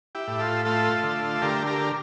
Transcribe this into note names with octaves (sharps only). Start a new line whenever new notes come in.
E4 G4
A2
F4 A4
A3 F4 A4
D3
D3 G4 A#4
G4 A#4